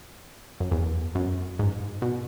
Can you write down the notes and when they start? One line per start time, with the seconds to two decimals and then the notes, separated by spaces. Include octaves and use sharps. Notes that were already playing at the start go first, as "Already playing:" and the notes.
0.60 F#2
0.71 E2
1.15 F#2
1.59 G#2
2.02 B2